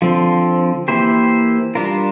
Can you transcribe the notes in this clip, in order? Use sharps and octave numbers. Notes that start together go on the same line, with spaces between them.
D3 F3 C4
E3 A#3 E4 G4 C5
G3 D4 F4 A#4